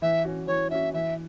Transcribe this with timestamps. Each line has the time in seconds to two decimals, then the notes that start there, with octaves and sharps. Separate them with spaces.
0.02 E3 E5
0.25 C#4 F#4
0.47 E3 C#5
0.70 C#4 F#4 E5
0.94 E3 E5